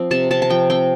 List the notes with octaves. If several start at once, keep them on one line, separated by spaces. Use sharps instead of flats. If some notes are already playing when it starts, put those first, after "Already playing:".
Already playing: F3 C4
C3 A5
C3 A5
A5
F3 G5
C4 G5